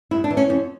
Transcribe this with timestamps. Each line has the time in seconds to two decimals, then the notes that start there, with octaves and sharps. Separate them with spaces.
0.11 G2 E4
0.24 D4
0.30 E3
0.37 C#4
0.49 F2 C#4